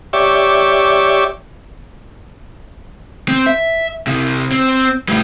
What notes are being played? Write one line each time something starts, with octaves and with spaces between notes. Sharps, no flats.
G4 C#5 D5 E5
C4
E5
C2 C3
C4
A2 G3